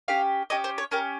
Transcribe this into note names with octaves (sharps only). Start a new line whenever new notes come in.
C#4 G4 F5
C#4 G4 D#5
C5
C#5
C#4 G4 A#4